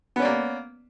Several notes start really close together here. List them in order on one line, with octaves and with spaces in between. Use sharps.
B3 C#4 D5 A#3